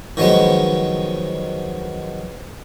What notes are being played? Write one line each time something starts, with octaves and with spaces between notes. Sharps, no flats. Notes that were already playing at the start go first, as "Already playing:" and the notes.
D#3 F3 F#3 G#3 B3